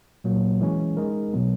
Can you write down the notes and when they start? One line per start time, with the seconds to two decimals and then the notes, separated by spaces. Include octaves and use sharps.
0.24 A#2 F#3 A#3
0.61 E3 G#3 C#4 G#4
0.97 G#3 D#4 A#4
1.33 B2 F#3 B3